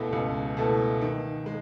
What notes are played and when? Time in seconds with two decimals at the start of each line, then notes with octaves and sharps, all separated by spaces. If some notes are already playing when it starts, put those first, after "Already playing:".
Already playing: C#2 B2 A3 E4 A4
0.13 C#2
0.57 B2 A3 E4 A4
1.02 D#3
1.46 G#3